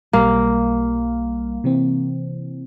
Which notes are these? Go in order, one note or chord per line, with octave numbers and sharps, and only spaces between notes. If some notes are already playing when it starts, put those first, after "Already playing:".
B1 G3 A#3 F5
C3 E3 C4